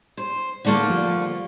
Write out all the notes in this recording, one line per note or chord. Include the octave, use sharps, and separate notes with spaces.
C5
D3 A3 A#3
F3 G3